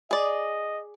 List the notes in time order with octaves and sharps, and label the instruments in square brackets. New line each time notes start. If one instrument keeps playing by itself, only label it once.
[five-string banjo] G#4 D5 [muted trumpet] D#5